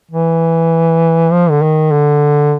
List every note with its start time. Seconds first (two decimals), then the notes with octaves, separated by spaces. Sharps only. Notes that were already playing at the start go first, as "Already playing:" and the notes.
0.11 E3
1.32 F3
1.50 D3
1.62 D#3
1.92 D3